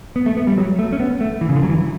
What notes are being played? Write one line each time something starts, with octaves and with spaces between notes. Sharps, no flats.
B3
A3
B3
G3
F#3
A3
C#4
B3
A3
E3
C#3
D3
F#3
E3